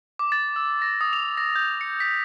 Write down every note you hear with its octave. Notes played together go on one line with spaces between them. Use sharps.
D6
A6
E6
A#6
D#6
F7
A#6
G6
C#7
B6